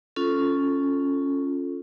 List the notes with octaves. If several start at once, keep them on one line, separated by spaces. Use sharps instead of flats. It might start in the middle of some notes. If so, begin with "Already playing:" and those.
C#4 F4 A4